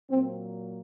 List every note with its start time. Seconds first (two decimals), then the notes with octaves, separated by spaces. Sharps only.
0.10 A#2 F#3 A#3 C4